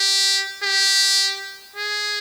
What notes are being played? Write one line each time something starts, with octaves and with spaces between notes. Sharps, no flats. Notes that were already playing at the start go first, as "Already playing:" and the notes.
Already playing: G4
G4
G#4